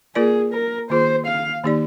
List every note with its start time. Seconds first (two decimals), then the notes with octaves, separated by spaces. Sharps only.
0.15 A#3 F4 G#4 A#4 D5
0.53 A#4
0.90 D#3 A#3 F4 G#4 C5
1.26 F5
1.63 D#3 A#3 D#4 G4 D5